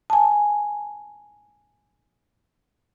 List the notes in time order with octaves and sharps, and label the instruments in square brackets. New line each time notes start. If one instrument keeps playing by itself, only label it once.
[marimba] G#5 A5